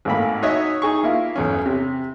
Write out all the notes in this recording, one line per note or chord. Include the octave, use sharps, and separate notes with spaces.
G#1 A2 A#3 B5
D#4 F#4 C#5 D#5 E5
D#4 G#4 C#6
A#3 E4 F4
B1 E2 C#4
C3